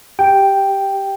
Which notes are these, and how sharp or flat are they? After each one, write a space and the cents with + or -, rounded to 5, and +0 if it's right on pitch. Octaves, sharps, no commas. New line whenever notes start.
G4 +0 G5 +0